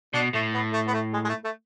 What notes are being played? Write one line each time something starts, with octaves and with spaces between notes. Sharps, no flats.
B2 D4
A2 A3
B3
A3
B3
A3
G#3
G#3
A3
A3